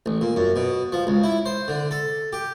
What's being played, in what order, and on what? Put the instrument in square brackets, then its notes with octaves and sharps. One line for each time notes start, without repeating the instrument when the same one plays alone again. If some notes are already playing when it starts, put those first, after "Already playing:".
[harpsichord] A1
A#2
F#2
B2
F3
C#2
E4
C5
D3
A4
G4